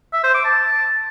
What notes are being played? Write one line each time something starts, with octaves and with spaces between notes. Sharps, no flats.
E5
C5
D6
A5